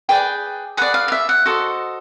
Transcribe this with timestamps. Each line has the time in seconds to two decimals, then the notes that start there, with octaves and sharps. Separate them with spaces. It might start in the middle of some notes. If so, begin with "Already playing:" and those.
0.09 G#4 B4 D5 G5
0.77 G#4 B4 D5 F#5
0.94 F5
1.08 F5
1.12 E5
1.29 F#5
1.46 F#4 A4 C5 D#5